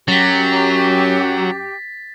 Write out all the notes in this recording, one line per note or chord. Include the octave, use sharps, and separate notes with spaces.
F#2 F#3 G4 A6 B6